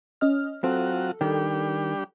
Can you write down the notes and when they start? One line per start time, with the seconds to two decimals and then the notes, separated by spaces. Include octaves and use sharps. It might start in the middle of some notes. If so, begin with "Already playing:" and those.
0.21 C#4 D#5 F6
0.64 F#3 C4 F4 F#4 A4
1.21 D#3 G3 D4 G4